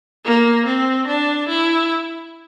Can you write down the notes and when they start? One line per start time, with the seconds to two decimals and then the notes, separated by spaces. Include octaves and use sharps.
0.25 A#3
0.66 C4
1.08 D4
1.49 E4